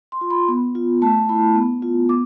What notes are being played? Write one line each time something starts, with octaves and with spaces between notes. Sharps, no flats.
C6
F4
B5
B3
F4
A3 A5
E4 B5
B3
F4
B3 D6